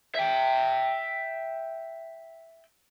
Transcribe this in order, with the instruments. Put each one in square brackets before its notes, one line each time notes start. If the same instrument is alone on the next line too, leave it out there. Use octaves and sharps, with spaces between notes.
[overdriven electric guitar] E5 G5